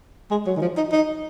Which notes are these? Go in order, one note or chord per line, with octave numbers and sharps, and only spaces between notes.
G#3
F#3
D#3
F3
D#4
D#4